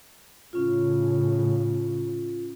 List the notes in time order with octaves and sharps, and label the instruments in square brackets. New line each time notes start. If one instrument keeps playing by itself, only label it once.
[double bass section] A2 C#3 [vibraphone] C#4 F4